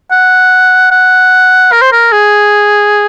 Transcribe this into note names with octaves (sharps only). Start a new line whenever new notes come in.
F#5
F#5
A#4
C5
A#4
G#4